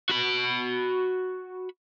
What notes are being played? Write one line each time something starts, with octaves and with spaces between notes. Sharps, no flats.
F#4 B5